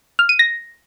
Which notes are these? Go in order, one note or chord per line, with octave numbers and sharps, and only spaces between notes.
F6
D#7
A#6